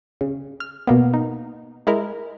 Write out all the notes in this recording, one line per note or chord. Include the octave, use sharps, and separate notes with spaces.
C#3
F6
B2 A#3 B3
D#4
G#3 E4 A#4